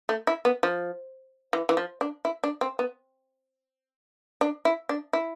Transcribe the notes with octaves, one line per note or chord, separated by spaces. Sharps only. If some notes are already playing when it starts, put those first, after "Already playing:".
A3
E4
B3
F3
E3
E3
F3
D4
E4
D4
C4
B3
D4
E4
D4
E4